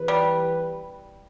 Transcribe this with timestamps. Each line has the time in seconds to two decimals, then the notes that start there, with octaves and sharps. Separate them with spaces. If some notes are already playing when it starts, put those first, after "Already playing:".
Already playing: E3 B3 G4 B4
0.08 G3